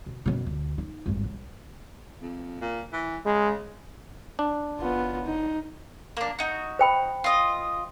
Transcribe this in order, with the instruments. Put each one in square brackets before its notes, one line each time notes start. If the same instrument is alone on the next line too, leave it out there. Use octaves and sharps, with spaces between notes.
[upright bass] B2
F#2 B2
D2
D#4
G#1 G2
B1
[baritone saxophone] F2
A#2
E3
[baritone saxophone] C#3 [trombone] G#3
[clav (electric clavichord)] D4
[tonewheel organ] F#1 [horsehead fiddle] B3 F4
[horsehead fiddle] D#4
[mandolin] A#3 D4
D#4 F#4
[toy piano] C5 G5 B5
[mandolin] F4 D#5